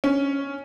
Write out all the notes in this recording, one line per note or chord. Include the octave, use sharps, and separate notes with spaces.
C#4